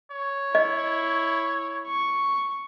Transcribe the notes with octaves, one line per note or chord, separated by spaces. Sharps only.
C#5
E4 D#5
C#6